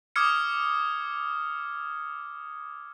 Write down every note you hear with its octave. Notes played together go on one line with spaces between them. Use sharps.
D6 D#6 F6 G#6 C#7